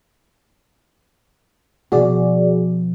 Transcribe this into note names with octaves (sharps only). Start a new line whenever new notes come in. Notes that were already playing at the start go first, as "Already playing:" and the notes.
B2 F3 F#4 G#4 D5